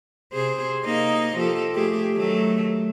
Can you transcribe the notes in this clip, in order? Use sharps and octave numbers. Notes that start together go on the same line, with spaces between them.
C3 G#4 C5
A#3 D#4 D#5
F3 G4 A4
A3 G4 G#4
D#3 F#3 A3